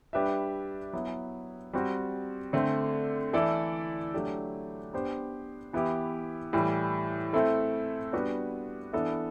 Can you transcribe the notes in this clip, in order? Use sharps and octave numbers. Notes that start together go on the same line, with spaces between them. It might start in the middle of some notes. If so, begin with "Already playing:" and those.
G3 D4 G4 B4 E5
F#3 B3 E4
G3 C4 F#4
D3 A3 C4
E3 A3 E4 A4 D5
F#3 A3 D4 G4
B3 D4 G4 C5
E3 B3 E4 G4
A2 E3 G3
A3 C4 E4 A4
G3 B3 D4 F#4 B4
E3 B3 D4 A4 E5